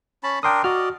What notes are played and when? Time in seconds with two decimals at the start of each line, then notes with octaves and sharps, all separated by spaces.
0.23 C#4 A5 B5
0.43 D4 A#4 G5 C6 D#6
0.64 F#4 D5 D#5 F6